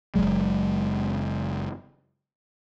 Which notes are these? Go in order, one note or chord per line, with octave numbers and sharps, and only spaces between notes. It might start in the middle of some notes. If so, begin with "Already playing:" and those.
F#1 E2 F#3 G#3